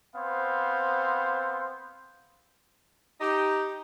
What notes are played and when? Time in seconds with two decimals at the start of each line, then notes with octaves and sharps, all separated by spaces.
0.16 B3 C4 C5 F5
3.21 D#4 G4